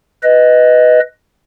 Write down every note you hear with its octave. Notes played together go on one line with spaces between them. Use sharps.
B4 D#5